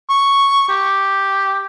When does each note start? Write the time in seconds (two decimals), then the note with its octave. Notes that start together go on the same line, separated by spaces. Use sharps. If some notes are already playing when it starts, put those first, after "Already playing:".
0.10 C#6
0.69 G4